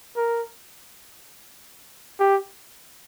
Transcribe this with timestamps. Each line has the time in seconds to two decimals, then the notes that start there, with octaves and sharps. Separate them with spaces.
0.17 A#4
2.19 G4